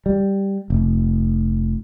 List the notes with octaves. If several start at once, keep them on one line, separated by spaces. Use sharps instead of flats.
G3
F1